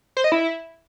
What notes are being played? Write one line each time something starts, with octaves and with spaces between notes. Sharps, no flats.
C5
D#5
E4